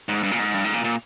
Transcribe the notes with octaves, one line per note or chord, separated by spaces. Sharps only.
G#2
G2
A#2
G#2
G2
G#2
A#2
A#2